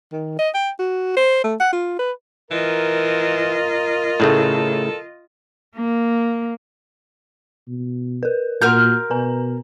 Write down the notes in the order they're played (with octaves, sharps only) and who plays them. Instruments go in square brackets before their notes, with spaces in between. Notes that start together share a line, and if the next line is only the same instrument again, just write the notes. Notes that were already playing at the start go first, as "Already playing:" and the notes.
[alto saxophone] D#3
D#5
G5
F#4
C5
A3
F#5
F4
B4
[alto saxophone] E3 [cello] F4 D#5 [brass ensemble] A#4
[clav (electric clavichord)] A2 C#3 A3 [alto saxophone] A4
[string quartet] A#3
[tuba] B2
[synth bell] A#4 B4
[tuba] A#2 [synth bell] F#4 F#5 C6 [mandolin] A#4 F6 G6
[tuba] B2 [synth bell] B4 G#5 A#5